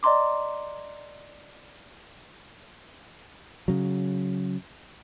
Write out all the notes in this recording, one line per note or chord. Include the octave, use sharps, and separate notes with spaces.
D5 D#5 A#5 C6 D6
C#3 F#3